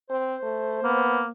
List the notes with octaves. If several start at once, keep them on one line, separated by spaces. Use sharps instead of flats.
C4 C5
A3
A#3 B3